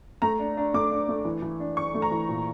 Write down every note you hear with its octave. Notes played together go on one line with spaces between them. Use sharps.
A3 A#5
D4
D4
A3 D6
D4
A3
E3
E3
D4
D4 C#6
A3
A#5
E3
A#2